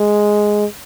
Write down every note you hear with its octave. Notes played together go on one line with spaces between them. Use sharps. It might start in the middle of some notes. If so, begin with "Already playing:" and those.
Already playing: G#3